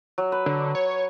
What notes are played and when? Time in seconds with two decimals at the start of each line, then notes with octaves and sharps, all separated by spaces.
0.18 F#3
0.32 B4
0.46 D3
0.75 C#5